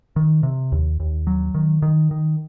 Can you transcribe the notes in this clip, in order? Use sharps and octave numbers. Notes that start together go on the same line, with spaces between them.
D#3
C3
D#2
D#2
F#3
D#3
D#3
D#3